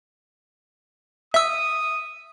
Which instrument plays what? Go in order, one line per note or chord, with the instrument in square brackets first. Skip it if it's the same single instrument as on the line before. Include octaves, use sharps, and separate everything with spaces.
[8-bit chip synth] E5 E6 [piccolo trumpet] D#6